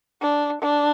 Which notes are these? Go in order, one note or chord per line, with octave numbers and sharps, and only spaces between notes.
D4
D4